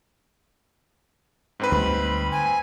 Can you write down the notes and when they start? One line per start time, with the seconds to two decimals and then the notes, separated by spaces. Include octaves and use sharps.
1.60 G#2 C4 B4
1.72 D2 G3 B5
2.31 G#5